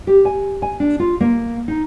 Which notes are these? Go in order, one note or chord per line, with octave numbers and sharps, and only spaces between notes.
G4
G#5
G#5
D4
F4
A#3
D#4